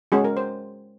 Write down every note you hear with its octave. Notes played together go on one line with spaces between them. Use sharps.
G#3 C#4 F#4 G#4
A#4
C5